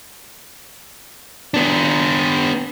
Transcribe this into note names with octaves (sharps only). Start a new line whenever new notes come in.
B3 D4